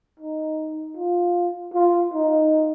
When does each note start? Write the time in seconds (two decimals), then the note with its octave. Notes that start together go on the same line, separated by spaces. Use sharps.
0.20 D#4
0.97 F4
1.74 F4
2.12 D#4